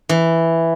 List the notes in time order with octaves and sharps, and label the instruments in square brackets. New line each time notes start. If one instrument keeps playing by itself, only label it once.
[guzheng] E3